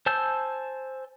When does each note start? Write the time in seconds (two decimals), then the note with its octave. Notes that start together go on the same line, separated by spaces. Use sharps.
0.06 C5 G#5 A5 E6 G6